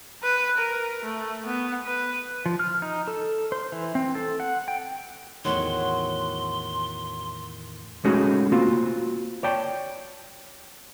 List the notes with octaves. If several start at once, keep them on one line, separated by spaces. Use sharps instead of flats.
B4
A#4
A3
B3
B4
F3
F6
D#4
A4
C5
E3
C4
A4
F#5
G5
E2 A2 D#3 F#3 C6
G#3 A3 C#4 D#4 F#4 G#4
A#3 C4 F4 F#4
C#5 D5 G5 A5